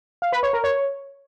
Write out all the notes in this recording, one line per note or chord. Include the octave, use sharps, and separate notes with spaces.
F5
B4
C#5
A#4
C#5